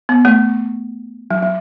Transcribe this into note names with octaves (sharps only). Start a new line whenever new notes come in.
B3
A3
F#3
F#3